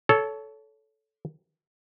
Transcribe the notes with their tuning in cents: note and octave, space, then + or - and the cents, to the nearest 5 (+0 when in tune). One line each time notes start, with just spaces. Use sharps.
A4 -10 C#5 +20